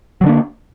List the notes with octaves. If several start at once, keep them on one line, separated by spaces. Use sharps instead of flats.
D3 F#3 A#3 D4